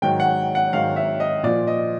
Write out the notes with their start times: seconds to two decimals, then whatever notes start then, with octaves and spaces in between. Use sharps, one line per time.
0.02 G#2 D#3 F#3 G5
0.20 F#5
0.55 F#5
0.73 G#2 D#3 F#3 F5
0.96 E5
1.20 D#5
1.43 A#2 F3 D5
1.67 D#5